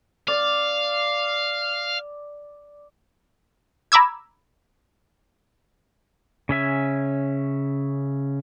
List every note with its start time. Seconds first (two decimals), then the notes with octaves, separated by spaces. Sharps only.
0.28 D5 F5
3.92 A#5 B5 D6 E6 G#6
6.49 C#3 C#4 E5 G#5